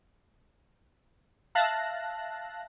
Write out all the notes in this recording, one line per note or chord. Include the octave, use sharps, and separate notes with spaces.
E5 F5 A5 F#6 A#6